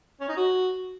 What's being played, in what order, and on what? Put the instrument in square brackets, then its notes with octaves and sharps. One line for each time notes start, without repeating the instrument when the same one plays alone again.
[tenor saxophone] C#4
D#4
F#4